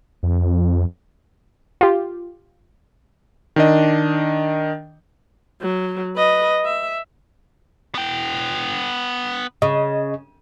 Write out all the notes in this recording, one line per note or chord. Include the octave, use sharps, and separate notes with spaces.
F2
F4 G4
D#3 D4 D#5
F#3
B4 D#5
E5
B3 G5
C#3 D#5